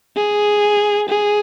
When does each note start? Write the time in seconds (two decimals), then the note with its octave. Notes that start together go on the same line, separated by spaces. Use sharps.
0.17 G#4
1.09 G#4